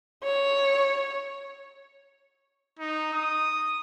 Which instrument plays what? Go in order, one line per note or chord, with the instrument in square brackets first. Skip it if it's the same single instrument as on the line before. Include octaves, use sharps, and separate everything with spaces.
[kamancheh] C#5
[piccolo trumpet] D#4
D#6